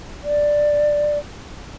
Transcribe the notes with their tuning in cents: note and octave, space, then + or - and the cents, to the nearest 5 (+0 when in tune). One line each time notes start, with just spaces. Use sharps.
D5 +5